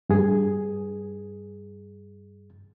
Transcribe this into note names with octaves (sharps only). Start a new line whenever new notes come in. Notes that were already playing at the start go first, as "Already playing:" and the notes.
G2 G#4